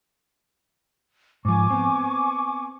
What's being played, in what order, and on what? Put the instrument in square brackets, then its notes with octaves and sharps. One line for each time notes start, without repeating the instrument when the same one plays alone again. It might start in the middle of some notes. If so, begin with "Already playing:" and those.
[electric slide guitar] G#2 F3 [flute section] G#5 C#6 D6
[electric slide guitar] B3 C4